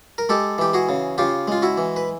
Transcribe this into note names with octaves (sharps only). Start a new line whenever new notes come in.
A#4
G#3 G4 A4
E3 G4
F#4 G#4
C#3
C#3 F4 G4
G#3 F4
E4 F#4
E3
B4